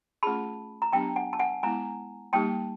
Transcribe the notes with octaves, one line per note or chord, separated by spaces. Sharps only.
A3 C#4 F4 G#4 A5 B5
A#5
F#3 B3 D4 G4 G5 A5
F#5 G#5
A5
F#5 G#5
G#3 B3 E4 G#5 A#5
G3 A#3 D#4 G4 G5 A5